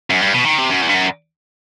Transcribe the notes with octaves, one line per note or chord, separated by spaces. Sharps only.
F#2
G2
B2
D#3
C3
F#2
E2
G2
F#2